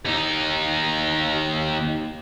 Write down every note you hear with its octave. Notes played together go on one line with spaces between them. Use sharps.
D#2 D#4